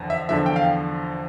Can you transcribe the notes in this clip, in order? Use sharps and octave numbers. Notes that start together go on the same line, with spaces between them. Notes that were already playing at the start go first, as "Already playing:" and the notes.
Already playing: E2 D3 F3
E5
E2 D3 F3 E5
G5
F5